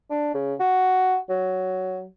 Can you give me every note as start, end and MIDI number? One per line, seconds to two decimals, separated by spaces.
0.10 0.30 62
0.34 0.55 49
0.60 1.17 66
1.30 2.05 54